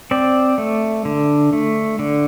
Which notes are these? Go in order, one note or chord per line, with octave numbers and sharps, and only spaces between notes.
C4 D5
A3
D3
A3
D3